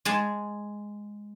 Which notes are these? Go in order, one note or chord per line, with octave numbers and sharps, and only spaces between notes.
G#3 G#4 A5